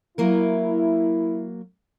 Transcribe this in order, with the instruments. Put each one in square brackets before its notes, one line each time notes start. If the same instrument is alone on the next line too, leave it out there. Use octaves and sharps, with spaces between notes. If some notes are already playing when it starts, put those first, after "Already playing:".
[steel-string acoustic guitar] F#3 A#3 A#4 [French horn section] E4